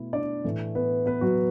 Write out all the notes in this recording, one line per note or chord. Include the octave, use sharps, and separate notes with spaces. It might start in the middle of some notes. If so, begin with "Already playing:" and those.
Already playing: B2 A3 E4
D4 D5
A2 E3 A3
B3 B4
B3 B4
F#3 F#4